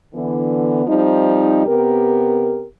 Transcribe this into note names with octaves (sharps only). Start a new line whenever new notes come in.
D3 E3 B3
F3 G3 C4 D#4
C3 B3 G4 A#4